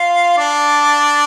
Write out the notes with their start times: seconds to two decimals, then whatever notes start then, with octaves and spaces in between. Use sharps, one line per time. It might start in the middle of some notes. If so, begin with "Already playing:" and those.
Already playing: F4 F5
0.38 D4 D5